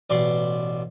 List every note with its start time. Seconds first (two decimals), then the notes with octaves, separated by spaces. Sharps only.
0.10 A1 B2 D5 C6